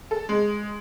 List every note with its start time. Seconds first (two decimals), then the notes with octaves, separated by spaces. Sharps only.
0.11 A4
0.29 G#3